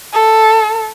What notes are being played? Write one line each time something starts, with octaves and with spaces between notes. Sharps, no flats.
A4